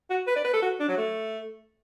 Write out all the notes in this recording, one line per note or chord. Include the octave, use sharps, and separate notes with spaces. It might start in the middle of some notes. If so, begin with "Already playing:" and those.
F#4
B4
D5
B4
A4
F#4
D4
F#3
A3